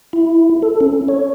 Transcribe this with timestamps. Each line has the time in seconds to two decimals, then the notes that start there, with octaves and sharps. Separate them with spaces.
0.13 E4
0.62 A4
0.81 C#4
1.08 C#5